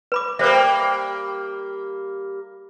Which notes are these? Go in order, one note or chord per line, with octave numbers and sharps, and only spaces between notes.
B4 B5 D6
G3 A#3 B4 C5 E5